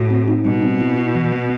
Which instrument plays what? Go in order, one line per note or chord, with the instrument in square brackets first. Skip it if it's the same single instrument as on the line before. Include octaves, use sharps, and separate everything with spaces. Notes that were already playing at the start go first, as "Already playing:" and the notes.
Already playing: [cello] A2 [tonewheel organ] F#4
[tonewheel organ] C4
D#4
[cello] B2 [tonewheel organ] G3
[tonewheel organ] C4
E4
E4
E3
B3